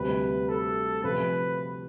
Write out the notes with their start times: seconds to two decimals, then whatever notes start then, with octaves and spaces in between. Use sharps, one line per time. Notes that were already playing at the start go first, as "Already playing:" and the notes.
Already playing: D2 C3 G3 C4 B4
0.49 A4
1.04 C3 F3 A3 B4